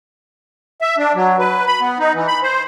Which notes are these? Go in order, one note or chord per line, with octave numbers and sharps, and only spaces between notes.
E5
D4
F#3
B4
B5
B3
D#4
E3
B5
C5